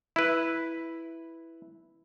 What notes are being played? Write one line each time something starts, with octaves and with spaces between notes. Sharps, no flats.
E4 B4